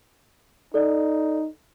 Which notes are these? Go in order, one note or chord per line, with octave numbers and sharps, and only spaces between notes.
D#4 A4 D5